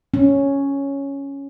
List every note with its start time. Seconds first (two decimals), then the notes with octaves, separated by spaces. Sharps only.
0.14 C#4